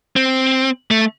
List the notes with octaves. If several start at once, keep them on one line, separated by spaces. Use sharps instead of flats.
C4
A3